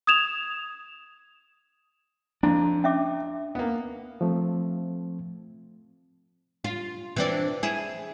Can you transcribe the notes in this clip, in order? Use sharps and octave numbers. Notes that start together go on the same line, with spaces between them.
D#6 G#6 E7 F7
F2 D4 E4
C#4 E5 D6
A#3 B3
F3 A3 C4
F4
E3 C4 D4
E4 G#4